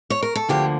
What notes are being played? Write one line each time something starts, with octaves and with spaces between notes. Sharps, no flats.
C#5
A#4
A4
D2 D3 F3 A#3 G4